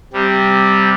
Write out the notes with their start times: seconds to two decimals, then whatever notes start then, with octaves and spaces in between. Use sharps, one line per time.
0.13 C3 G3